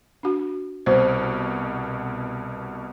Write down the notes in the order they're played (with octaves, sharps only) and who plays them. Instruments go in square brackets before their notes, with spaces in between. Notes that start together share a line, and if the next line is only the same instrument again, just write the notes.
[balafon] D4 F#4
[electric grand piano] C2 B2 [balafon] C5